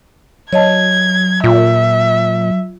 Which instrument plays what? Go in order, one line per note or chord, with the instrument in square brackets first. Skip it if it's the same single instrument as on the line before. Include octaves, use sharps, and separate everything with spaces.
[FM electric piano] F#3 [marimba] C#5 D#5 A5 [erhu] G#6
[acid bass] A#2 [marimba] F4 [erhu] E5